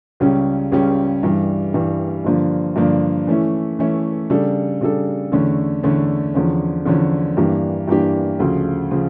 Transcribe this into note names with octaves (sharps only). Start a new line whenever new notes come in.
C#2 C#3 G3 C#4
C#2 C#3 G3 C#4
G2 E3 G3
G2 E3 G3
G2 D3 F3 A#3 D4
G2 D3 F3 A#3 D4
E3 A3 C#4 E4
E3 A3 C#4 E4
C#3 G3 D4 A4
C#3 G3 D4 A4
E2 D3 A3 C#4
E2 D3 A3 C#4
E2 D3 F3 C#4
E2 D3 F3 C#4
G2 E3 A#3 D4 G4
G2 E3 A#3 D4 G4
D2 C#3 F3
C#3 F3